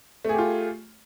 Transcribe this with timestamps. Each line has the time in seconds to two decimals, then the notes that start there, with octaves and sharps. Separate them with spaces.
0.25 A3
0.29 G#4
0.34 G4
0.38 F4